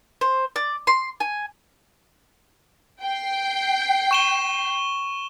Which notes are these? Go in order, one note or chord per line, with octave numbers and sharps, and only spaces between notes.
C5
D5
C6
G#5
G5 C7
C#6 E7 G7